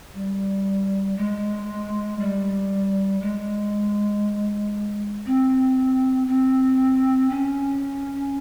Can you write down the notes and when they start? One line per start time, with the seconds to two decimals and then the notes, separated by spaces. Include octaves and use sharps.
0.14 G3
1.17 G#3
2.19 G3
3.21 G#3
5.26 C4
6.27 C4
7.30 C#4